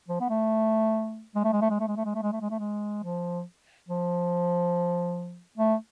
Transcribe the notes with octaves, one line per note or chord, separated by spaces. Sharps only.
F3
B3
A3
G#3
A3
G#3
A3
G#3
A3
G#3
A3
G#3
A3
G#3
A3
G#3
A3
G#3
F3
F3
A3